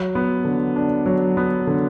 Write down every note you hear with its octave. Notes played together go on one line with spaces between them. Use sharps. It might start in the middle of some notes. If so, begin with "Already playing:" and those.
Already playing: F#3
B3
D3
D4
F#3
B3
D3